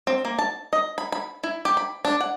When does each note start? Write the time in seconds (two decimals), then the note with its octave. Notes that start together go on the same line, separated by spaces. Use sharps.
0.07 C4
0.25 A#3
0.39 A5
0.73 D#5
0.98 B5
1.12 B5
1.43 E4
1.65 G4
1.77 B5
2.05 D4
2.21 F#5